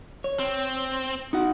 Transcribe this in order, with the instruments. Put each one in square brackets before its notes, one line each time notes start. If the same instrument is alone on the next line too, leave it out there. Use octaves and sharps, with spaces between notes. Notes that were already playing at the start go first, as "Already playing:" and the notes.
[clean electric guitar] C#5
[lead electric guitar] C4
[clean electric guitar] D#4 F#4 F#5